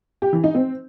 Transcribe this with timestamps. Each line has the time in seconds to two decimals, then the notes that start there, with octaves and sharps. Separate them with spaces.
0.22 G4
0.33 E3
0.44 D#4
0.54 C4